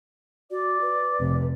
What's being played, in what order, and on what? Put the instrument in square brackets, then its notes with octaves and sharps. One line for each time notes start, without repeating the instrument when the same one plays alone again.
[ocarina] F#4 [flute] D5
[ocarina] B4
[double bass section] F1 C3